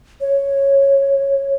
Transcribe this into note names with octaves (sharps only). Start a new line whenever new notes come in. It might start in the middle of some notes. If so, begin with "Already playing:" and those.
C#5